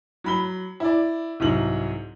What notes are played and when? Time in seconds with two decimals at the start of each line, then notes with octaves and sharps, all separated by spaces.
0.24 F#3 B5 G7
0.80 E4 D5
1.40 C2 G#2 F#3 F#7